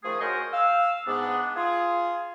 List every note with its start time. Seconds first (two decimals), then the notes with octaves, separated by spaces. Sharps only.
0.03 D#3 F3 A3 G#4
0.20 F#4 G#4 A#4 C5 C#5 D#5
0.52 F5 E6
1.06 G#2 B3 D4
1.56 F4 G#4